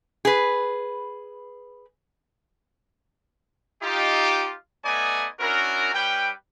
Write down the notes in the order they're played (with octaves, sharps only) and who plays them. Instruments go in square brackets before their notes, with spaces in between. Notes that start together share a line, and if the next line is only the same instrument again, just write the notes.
[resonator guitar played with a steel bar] G#4 B4
[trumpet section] D#4 F4 G4
A3 B3 D#4 D5 D#5 G#5
C#4 D4 E4 F#4 A#4
G3 C#4 B4 G5